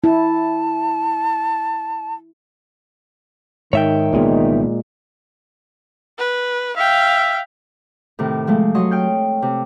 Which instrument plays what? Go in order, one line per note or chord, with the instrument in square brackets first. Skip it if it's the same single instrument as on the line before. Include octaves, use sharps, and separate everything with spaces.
[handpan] E4 [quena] A5
[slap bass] G#2 [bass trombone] D#3 [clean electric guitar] C#5 E5 G5
[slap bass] C2 E3 B3 [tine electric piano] A#2 G#3
[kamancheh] B4
[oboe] E5 [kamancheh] F5 G5
[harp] A2 C3 D#3
F3 G#3 A3
F#3 C#5 D#5 C6 D#6
G5 F6 G6
C3